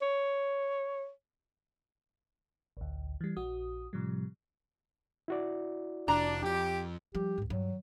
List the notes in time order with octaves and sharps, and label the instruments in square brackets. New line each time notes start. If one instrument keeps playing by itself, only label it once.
[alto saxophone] C#5
[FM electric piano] A1 D2
E3 G3
A#1 F#4 D#6
A2 C3 F3 G3
[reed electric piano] E4 F#4 D5
[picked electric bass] F1 [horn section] D4 [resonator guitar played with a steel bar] A#5
[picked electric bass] F2 [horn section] G4
[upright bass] F3 G3 [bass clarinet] G4
[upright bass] C#2 G#2
[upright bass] G2 D#3 [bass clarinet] F#3